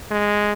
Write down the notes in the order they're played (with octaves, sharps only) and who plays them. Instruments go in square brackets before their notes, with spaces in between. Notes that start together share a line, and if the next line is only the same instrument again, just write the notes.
[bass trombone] G#3